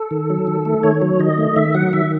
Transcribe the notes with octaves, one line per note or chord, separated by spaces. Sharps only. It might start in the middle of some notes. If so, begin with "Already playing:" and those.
Already playing: A4
D#3
F#3
D#3
A3
D#3 C#5
F#3
D#3 D#5
A3
D#3 E5
F#3 F#5
D#3 E5